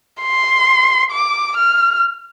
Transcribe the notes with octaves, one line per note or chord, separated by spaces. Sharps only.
C6
D6
F6